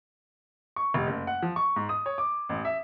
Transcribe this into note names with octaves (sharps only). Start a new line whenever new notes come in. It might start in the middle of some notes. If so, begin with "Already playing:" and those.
C#6
F1
F#1
F#5
F3
C#6
G#2
D#6
C#5
D6
A1
E5